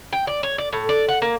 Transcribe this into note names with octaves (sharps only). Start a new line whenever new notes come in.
G5
D5
C#5
D5
A2
D5
F#5
A#3